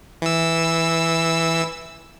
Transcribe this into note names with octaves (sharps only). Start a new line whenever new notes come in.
E3 E6